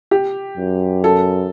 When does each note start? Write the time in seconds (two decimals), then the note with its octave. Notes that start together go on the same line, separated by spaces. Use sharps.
0.11 G4
0.57 F#2
1.04 A4